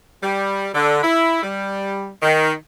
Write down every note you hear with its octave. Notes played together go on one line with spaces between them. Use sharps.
G3
D3
E4
G3
D#3